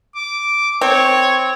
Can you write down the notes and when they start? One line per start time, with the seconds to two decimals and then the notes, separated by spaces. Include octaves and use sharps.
0.15 D6
0.81 C4 C#5